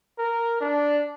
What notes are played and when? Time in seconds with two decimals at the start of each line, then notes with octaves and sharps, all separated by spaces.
0.18 A#4
0.61 D4